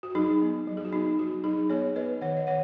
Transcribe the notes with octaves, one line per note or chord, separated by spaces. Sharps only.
F#4
F#3 D#4 G#4
B3
F#3
G#4
F#4
B3 D#4
F#3 F#4
F#3 D#4 G#4
B3 G#4 C#5
B3 B4 D#5
D#3 C#5 F#5
D#5
D#3 C#5 F#5